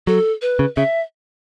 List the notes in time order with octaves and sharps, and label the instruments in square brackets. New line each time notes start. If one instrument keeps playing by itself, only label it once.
[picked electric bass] F#3 [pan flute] A4
[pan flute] B4
[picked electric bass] C#3
[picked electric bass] C#3 [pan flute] E5